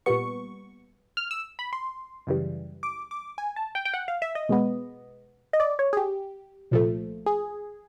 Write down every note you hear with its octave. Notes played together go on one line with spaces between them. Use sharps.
A#2 G3 B3 C#6
F6
E6
B5
C6
F#2 C#3 E3 G3
D6
D6
G#5
A5
G5
G5
F#5
F5
E5
D#5
B2 G#3 B3
D#5
D5
C#5
G#4
G4
C2 A#2 F3 A3
G#4